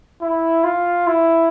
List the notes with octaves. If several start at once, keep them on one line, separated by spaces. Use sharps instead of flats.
E4
F4
E4